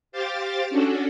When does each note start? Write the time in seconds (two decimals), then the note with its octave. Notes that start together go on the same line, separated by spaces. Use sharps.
0.12 G4 C5 F5 D6 A6
0.70 C#4 D4 F#4 A4